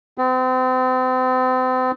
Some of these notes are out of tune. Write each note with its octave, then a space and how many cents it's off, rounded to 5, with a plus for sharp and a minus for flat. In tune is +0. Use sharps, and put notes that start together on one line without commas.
C4 -35